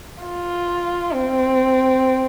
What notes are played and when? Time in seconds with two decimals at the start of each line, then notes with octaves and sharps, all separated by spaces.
0.24 F4
1.14 C4